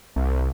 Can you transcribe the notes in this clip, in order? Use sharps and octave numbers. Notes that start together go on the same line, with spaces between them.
C2